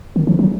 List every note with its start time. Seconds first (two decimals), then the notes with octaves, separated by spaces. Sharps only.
0.16 D#3
0.27 F3
0.39 F#3